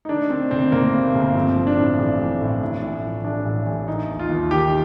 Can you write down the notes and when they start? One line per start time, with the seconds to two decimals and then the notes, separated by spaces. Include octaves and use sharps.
0.05 D#4
0.09 D#3 D4
0.30 D#3 C4
0.51 G1 C4
0.72 G1 A#3
0.93 G2
1.14 G1
1.35 F3 C4
1.56 F3
1.67 D4
1.77 A2
1.98 A1
2.19 A2
2.41 A2
2.61 A1
2.82 A2
3.03 F3
3.24 A1 D4
3.46 A1
3.67 A1
3.88 D#3 D#4
4.08 D#2
4.19 F4
4.29 D#2
4.51 D#3 G4